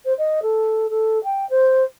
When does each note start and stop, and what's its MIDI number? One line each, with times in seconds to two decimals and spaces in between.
0.05 0.13 72
0.18 0.40 75
0.42 0.86 69
0.90 1.21 69
1.23 1.47 79
1.49 1.83 72